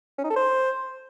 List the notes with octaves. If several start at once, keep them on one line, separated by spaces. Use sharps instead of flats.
C#4
D#4
A4
C5